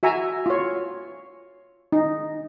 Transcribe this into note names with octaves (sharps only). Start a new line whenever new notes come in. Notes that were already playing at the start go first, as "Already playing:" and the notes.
F#4 E5 G#5 A#5
F4 C#5
D#4